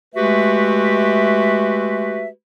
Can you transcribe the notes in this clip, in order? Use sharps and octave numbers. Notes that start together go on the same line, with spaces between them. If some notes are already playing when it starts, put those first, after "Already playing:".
G#3 A3 F#4 G4 B4 E5